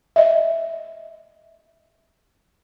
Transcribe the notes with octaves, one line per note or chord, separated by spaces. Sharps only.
D#5 E5